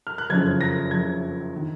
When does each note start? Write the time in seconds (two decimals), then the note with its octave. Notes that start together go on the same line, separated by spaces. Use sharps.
0.07 F6
0.18 F#6
0.30 F#1 F2 C#3 G#6
0.61 A#6
0.91 F#1 F2 C#3 G#6
1.56 D#3